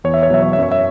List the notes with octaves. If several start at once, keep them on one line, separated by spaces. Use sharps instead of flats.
E2 C#5
E5
C#5
B2 F#3 E5
C#5
F#2 E5
C#5
E5